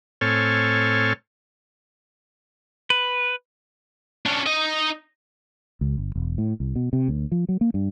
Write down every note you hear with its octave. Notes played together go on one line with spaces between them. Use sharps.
A2 C4 A4 C#5 G#5 F6
B4
C#4 D4
D#4 D#5
C#2
G1
E1
A2
C2
B2
C3
D2
F3
F#3
A#3
G2